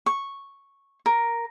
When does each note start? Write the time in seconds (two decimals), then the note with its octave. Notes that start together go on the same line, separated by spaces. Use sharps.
0.06 C#6
1.06 A#4